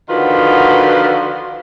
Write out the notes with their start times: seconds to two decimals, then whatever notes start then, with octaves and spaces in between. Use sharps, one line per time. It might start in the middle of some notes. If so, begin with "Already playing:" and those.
0.09 D3 D#3 F3 F4 F#4 B4